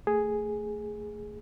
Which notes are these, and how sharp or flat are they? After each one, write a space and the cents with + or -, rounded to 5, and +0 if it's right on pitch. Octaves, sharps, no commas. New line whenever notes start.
A3 +15 G#4 +0